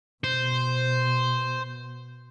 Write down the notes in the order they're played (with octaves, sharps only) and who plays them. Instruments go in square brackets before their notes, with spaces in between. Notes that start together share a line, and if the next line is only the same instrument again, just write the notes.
[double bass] B2 [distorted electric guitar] C5